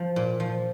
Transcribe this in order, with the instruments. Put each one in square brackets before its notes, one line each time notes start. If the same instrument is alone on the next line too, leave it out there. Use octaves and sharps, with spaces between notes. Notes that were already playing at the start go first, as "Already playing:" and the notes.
Already playing: [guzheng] F3
A#2
F3